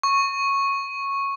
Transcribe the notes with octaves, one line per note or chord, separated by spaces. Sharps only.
C#6